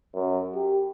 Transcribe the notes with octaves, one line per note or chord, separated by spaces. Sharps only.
F#2
G4